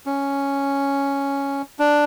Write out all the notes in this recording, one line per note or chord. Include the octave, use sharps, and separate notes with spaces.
C#4
D4